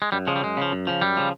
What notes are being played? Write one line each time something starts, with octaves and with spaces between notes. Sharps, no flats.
G#3
F#2 G3
C#3 F3 G#3
G3
F#2 G#3
C#3 F3
F#2
C#3 F3
F#2 G3
C#3 F3